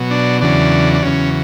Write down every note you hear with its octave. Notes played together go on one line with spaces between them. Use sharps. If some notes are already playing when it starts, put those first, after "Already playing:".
Already playing: B2 F#3
D4
E2 C#3 F#3 D4
D4
E2 C#3 F#3 C#4